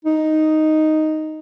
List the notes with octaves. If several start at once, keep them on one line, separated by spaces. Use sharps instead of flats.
D#4